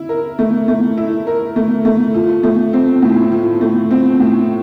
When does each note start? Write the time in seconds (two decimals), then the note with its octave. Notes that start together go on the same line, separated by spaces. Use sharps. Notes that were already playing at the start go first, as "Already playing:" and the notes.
Already playing: E4
0.09 A#4
0.39 A3
0.68 A3
0.97 E4
1.27 A#4
1.56 A3
1.85 A3
2.14 F3
2.43 A3
2.73 C4
3.02 A2
3.32 F3
3.61 A3
3.91 C4
4.20 A2